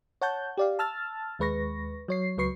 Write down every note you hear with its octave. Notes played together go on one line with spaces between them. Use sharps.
C#5 F#5 A5 G6
G4 D5 F5
A5 E6 F6 A6
D#2 G#3 B4 C#6 A#6
F#3 C#5 C7
C#2 F#3 B4 C#6 C7